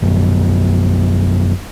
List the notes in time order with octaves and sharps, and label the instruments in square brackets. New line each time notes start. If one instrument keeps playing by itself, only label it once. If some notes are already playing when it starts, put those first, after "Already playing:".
[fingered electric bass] A#1 F#2